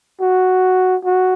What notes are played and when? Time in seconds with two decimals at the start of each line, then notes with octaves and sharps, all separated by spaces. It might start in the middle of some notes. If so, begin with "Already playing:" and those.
0.21 F#4
1.05 F#4